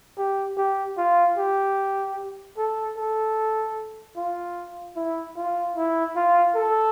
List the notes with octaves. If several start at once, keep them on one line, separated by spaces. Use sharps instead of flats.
G4
G4
F4
G4
A4
A4
F4
E4
F4
E4
F4
A4